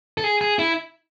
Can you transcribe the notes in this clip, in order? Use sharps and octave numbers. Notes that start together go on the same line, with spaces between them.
A4
G#4
G#4
E4